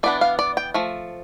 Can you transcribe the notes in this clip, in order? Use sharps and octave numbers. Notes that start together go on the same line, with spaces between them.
E3 B3 D4 D5
F5
D5
G5
F3 A3